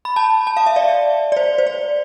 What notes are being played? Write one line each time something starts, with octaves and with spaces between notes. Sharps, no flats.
B5
A5
A5
F5
E5
D5
D5
C5
C5
D5